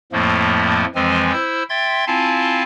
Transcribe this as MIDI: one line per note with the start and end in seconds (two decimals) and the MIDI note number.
0.12 0.85 41
0.12 0.85 45
0.12 0.85 53
0.12 0.85 57
0.12 0.85 58
0.95 1.32 41
0.95 1.32 52
0.95 1.32 53
0.95 1.32 56
0.95 1.32 60
0.95 1.32 80
1.33 1.63 64
1.33 1.63 72
1.33 1.63 88
1.69 2.05 76
1.69 2.05 79
1.69 2.05 84
1.69 2.05 92
1.69 2.05 93
2.07 2.63 60
2.07 2.63 64
2.07 2.63 65
2.07 2.63 77
2.07 2.63 80
2.07 2.63 81